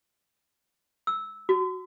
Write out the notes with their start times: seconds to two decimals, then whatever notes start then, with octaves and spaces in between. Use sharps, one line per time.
1.07 E6
1.49 F#4